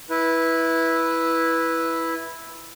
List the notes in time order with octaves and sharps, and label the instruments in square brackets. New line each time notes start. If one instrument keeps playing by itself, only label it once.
[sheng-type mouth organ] E4 B4